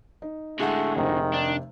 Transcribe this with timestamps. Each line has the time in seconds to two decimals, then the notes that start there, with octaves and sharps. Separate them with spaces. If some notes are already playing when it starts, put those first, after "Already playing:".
0.22 D#4
0.60 A2 D3 G#3 A3 F#5
0.96 F1 C3 D#3 C5
1.34 D4